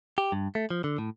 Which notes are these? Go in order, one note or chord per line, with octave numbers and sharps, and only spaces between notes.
G4
G2
A3
F3
D3
A2